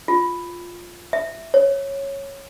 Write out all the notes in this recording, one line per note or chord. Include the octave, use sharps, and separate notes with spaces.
F4
E5
C#5